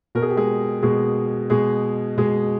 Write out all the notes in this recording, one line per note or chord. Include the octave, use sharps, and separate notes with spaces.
B2 A#4
G#4
G4
G#3 G#4
B2 G#3 G#4
B2 G#3 G#4
B2 G#3 G#4